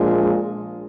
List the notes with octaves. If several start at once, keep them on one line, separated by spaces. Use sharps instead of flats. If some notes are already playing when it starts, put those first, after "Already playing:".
Already playing: A#1 A#2 F3 G#3